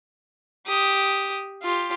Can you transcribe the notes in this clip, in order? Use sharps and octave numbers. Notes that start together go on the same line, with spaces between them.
G4 D#6
F4 G4